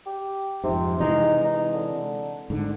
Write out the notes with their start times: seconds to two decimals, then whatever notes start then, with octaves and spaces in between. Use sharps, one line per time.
0.06 G4
0.64 F2 G#2 C3
1.00 C3 E3 G#3 D#4
1.44 D#4
1.73 D3
2.50 G#2 D3